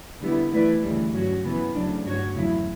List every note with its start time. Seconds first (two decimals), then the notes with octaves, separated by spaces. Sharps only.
0.20 D3 G3 B3 E4
0.51 E3 A3 E4 B4 D5
0.82 D2 C#3 E3 G3
1.12 G2 F#3 C#4 F#4
1.43 C#3 E3 B3
1.74 D2 C#3 F#3 A3 D4
2.04 G2 F#3 C#4 F#4 C#5
2.35 E2 C#3 F#3 A3 E4